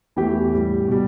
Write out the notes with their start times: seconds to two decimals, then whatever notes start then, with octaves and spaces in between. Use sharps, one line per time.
0.16 E2 E3 A3 G4
0.52 A2 G3
0.88 B2 G3